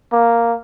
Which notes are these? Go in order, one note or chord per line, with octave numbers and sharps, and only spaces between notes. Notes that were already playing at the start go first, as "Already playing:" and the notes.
A#3